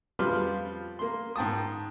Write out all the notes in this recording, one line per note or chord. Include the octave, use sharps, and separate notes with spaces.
F2 G3 F4 B4 C6 F6
A#3 C6
G#2 G5 A5 D#6